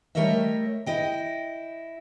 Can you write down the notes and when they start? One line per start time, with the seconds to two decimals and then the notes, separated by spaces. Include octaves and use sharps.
0.15 G3 A3 A#4 C#5 D#5 E5
0.86 E4 D#5 G5